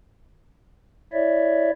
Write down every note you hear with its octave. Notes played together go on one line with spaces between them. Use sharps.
E4 C#5 D5 E5